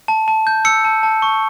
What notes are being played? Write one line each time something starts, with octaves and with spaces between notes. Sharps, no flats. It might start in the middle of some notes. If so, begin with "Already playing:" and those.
A5
A5
G6
E6 C#7
A5
A5
C#6